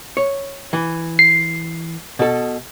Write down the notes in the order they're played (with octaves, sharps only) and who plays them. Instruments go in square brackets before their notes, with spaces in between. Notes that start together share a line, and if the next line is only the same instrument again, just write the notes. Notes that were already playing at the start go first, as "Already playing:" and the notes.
[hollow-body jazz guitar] C#5
E3
[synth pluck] C7
[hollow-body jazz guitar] B2 A4